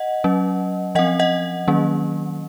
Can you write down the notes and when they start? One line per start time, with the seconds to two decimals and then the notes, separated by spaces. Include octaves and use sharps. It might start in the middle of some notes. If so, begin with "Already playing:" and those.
Already playing: D#5 F#5
0.24 F#3 C#4
0.95 F3 C4 D#5 F#5
1.19 D#5 F#5
1.68 D#3 F#3 A#3 C#4